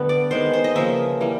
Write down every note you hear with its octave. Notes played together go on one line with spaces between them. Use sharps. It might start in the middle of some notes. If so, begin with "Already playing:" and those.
Already playing: D3 G3 A3 B3
D5
D#3 G#3 B3 C5
C5
D#5
C#3 F3 A#3 E5
E3 G3 A#3